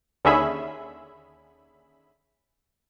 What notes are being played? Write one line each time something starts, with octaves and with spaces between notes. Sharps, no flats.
D#2 D3 C#4 G#4 E5 B5